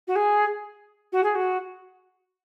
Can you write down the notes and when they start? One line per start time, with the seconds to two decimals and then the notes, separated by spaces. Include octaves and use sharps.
0.07 F#4
0.15 G#4
1.12 F#4
1.23 G#4
1.35 F#4